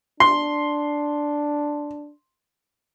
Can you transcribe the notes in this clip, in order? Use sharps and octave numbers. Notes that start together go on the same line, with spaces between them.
D4 C6